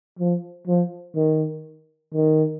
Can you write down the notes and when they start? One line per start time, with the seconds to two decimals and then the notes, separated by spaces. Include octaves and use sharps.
0.19 F3
0.67 F3
1.15 D#3
2.14 D#3